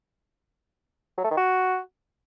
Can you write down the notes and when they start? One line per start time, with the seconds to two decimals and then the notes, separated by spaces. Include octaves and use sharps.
1.18 F#3
1.24 A3
1.31 D#3
1.37 F#4